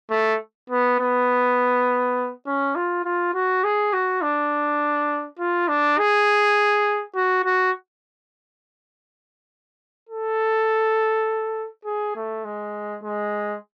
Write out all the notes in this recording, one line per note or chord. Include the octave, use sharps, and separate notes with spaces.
A3
B3
B3
C#4
F4
F4
F#4
G#4
F#4
D4
F4
D4
G#4
F#4
F#4
A4
G#4
A3
G#3
G#3